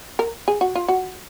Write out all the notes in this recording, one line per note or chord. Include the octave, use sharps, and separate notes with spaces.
A#4
G#4
F#4
F4
F#4